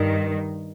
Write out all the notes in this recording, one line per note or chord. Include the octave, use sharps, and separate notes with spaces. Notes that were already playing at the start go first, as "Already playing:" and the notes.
Already playing: G2 D#3